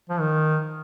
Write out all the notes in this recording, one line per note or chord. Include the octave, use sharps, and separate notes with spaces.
F3
D#3